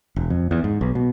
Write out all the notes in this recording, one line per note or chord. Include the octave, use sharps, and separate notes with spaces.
E1
F2
E2
G#2
B1
B2